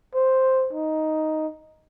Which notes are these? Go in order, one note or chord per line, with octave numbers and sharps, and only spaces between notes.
C5
D#4